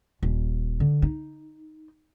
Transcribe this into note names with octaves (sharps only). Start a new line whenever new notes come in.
D#1
D3
D#4